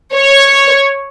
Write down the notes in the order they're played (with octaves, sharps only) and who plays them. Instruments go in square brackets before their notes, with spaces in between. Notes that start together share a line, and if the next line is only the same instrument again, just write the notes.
[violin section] C#5